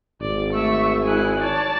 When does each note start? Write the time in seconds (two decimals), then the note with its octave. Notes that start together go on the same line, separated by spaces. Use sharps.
0.21 G#1 D5
0.53 A3 E5 C#6 E6
1.04 G#3 E4 G#5 F#6
1.40 C#5 D5 A5 A6